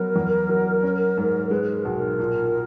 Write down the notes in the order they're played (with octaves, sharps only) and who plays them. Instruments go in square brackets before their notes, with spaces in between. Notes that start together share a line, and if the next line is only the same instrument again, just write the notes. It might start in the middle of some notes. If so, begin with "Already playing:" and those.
Already playing: [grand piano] F#3 B3 [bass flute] A#4
[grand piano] E2
F#3
C#4
G#2
[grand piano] G#3 [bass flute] B4
[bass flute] A#4
[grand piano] B1
[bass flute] A#4
[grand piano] A#2